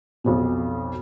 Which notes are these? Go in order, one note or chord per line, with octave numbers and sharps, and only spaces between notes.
B1 F2 B2